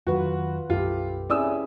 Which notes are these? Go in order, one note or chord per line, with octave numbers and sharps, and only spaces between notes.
F2 D#3 F#3 F4 F#4 B4
B1 F#2 F4 G4 A4
C4 C#4 E4 G#4 D5 D#6 E6